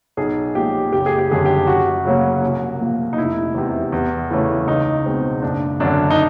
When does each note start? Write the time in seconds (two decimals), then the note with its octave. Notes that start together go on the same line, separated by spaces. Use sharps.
0.17 B1 G#4
0.55 A#2 F3 G#3 C#4 G4
0.92 F#1 G4
1.06 G#4
1.18 G4
1.30 F#2 D3 G3 G#4
1.45 G4
1.67 F#2 F#4
2.05 C#3 F#3 A#3 C#4
2.42 C2
2.80 A#2 F3 A#3
3.13 D#4
3.18 F1 E4
3.55 E2 C3
3.92 E2
4.30 C#3 E3 A3 C#4
4.67 C#2 D#4
5.06 B2 G#3 C4
5.42 F#1 D4
5.80 F#2 D3 D4
6.10 D#4